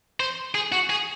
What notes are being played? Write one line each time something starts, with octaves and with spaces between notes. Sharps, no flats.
C5
G#4
F#4
G#4